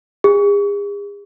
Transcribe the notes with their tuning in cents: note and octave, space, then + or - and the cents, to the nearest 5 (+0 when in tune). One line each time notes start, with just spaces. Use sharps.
G#4 -40